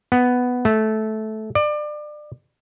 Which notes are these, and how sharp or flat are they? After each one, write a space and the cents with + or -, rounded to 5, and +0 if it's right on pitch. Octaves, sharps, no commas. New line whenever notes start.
B3 +5
A3 -15
D5 +30